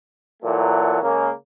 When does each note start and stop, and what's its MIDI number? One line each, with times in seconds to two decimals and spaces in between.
0.43 1.01 46
0.43 1.01 52
0.43 1.01 54
0.43 1.01 57
0.43 1.01 69
1.01 1.30 49
1.01 1.30 56
1.01 1.30 58